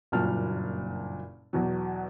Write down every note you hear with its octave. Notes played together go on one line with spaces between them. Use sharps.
F#1 G2 A#2 F#3 A5 F6
E2 B2 F#3